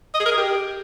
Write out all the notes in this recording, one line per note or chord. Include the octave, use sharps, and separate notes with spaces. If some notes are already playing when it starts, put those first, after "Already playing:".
D#5
G#4
A#4
G#4
G4